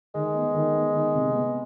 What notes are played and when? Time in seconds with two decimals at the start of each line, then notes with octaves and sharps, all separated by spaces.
0.15 D#3 G#3
0.35 B3
0.54 D#3
0.74 B3
0.95 D#3
1.14 C3
1.35 B3